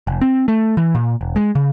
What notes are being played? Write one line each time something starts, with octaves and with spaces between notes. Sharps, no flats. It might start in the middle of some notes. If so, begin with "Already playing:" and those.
F1
C4
A3
E3
A#2
E1
G#3
C#3